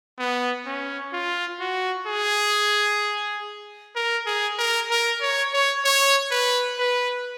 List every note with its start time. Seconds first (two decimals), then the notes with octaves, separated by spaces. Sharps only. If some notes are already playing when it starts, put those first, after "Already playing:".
0.19 B3
0.66 C#4
1.13 F4
1.60 F#4
2.07 G#4
3.96 A#4
4.26 G#4
4.58 A#4
4.90 A#4
5.21 C#5
5.53 C#5
5.84 C#5
6.31 B4
6.79 B4